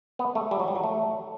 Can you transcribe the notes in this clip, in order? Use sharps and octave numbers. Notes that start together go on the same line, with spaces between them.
B3
A3
G3
F#3
G3
F#3
A3